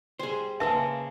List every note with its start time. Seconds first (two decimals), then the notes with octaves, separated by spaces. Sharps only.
0.19 G3 G#4 C5 G#5 C6
0.60 C#3 G#3 A#3 B4 E5 A5